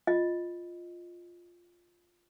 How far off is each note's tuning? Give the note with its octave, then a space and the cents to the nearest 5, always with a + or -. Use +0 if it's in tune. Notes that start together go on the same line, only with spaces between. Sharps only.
F4 +0 D#5 +0